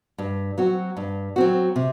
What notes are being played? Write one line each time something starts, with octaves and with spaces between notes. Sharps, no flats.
G2
F#3 C4 F#4
G2
F#3 C4 F#4
C3